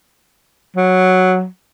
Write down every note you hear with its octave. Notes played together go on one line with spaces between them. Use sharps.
F#3